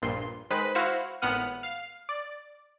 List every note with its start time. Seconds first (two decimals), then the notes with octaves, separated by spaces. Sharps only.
0.02 A#1 G2 A#2 C6
0.50 D#3 G#3 B4 C5 B5 D#7
0.75 E4 F#4 C5 F5
1.22 G#1 A2 B3 F#5 F6 D#7
1.63 F5
2.09 D5